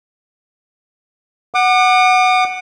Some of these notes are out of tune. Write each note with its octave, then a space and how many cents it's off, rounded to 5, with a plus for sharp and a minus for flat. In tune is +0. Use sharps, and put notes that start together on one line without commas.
F#5 +0 D6 +40